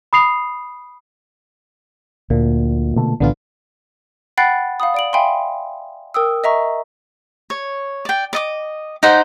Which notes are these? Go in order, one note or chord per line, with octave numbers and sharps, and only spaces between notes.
B5 D#6 C7 F7
D2 A#2
B2 D3 A3
B1 A2 D3 E3 B3 F4
F#5 G5 B5 F#6 A6 C7
F5 F#5 B5 D#6
D5 D7 F#7
E5 F5 G5 G#5 B5 C6
A#4 G5 D#6 E6
D#5 E5 A#5 C#6
C#5
D5 G5
D5 D#5 D6
D#4 G4 C5 F#5